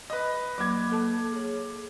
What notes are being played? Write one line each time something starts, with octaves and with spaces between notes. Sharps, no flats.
B4 D#5
F#3 A#3 B5 D6 G#6
A#3 A4 A5
G#4 C#5